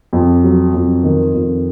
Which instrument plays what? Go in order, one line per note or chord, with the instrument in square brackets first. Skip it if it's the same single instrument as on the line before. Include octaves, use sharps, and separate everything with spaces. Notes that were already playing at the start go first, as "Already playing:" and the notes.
[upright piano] F2
F#3
F2
D#3
F2